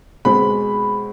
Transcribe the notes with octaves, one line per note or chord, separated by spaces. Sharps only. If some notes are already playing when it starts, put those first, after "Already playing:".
B2 G#3 C4 B5